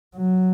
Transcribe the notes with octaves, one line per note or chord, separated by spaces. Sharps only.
F#3